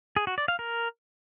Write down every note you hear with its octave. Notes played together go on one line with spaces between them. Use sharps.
G#4
F#4
D5
F5
A#4